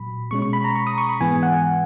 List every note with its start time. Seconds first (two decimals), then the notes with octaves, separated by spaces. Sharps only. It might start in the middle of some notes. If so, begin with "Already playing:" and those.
Already playing: A#2 F#3 B5
0.31 B2 G#3 C#4 C#6
0.42 C#6
0.53 B5
0.64 A#5
0.75 C#6
0.87 D#6
0.98 C#6
1.09 B5
1.21 G#2 E3 G#3 B3 G#5
1.43 F#5